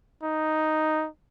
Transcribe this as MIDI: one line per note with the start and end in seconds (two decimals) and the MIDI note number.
0.23 1.07 63